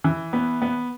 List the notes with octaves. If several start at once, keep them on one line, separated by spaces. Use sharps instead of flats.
E3
B3
B3